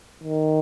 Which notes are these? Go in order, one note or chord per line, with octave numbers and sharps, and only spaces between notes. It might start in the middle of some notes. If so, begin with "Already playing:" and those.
D#3